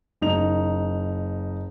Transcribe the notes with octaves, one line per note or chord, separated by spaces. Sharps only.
F#1 D#4 F7